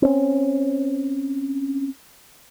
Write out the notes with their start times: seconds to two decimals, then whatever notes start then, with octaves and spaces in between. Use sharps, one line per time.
0.02 C4 C#4